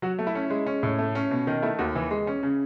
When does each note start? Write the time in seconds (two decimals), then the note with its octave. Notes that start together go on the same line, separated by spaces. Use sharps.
0.02 F#3 F#4
0.19 A3
0.27 E4
0.35 C#4
0.50 G#3
0.66 C#4
0.83 A2
0.99 A3
1.15 C#4
1.31 B2
1.47 D#3 D#4
1.62 A3 E4
1.79 D#2 F#4
1.95 E3
2.11 G#3
2.27 C#4
2.43 C#3